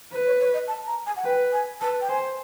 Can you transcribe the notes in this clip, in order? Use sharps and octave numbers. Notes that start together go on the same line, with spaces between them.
B4 C5
C#5
C#5
D#5
A5
A#5
G#5
F#5
B4 G5
G#5
B4 A5
G5
C5 G#5